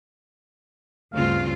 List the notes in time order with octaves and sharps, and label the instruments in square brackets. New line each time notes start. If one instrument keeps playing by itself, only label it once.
[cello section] D2 C4 F4 [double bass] G2 C#3 [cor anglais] F5